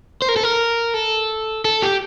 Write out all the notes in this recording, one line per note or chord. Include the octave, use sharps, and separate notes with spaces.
C5
A#4
A4
A#4
A4
A4
G4